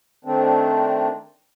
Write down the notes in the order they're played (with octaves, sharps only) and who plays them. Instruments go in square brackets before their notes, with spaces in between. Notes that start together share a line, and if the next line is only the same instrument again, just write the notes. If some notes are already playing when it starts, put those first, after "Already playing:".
[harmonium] D#3 A3 C4 D4